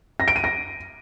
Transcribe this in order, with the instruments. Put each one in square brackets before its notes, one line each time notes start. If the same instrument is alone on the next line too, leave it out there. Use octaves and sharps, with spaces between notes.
[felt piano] A#6
D7
D#7
A#6